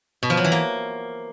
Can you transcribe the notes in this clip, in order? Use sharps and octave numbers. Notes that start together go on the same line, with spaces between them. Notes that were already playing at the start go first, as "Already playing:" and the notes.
B2
F3
F#3
E3
A#3